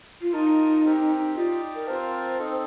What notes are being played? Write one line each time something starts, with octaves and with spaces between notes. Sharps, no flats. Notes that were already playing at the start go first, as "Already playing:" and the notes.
F4
D#4 F4 A#4 D#5 A5
C4 G4 A#4
D#4 F4 G4 D5
A#4
C4 F4 A#4 C5 F5 A5
C4 D#4 A4